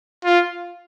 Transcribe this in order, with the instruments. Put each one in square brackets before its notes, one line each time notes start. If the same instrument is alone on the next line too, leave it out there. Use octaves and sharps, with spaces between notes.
[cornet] F4